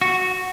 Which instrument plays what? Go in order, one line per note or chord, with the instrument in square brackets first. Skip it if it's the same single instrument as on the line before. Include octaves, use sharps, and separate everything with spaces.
[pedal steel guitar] F#4